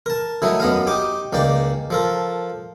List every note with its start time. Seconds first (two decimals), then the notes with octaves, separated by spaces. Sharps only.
0.06 A#4 A5
0.42 D#3 F#3 A3 E4 D#5
0.60 F#2 B3 D#5 F5
0.87 D#4 G4 D6
1.33 C#2 D#3 A#3 D5 G5
1.90 F3 A4 A#4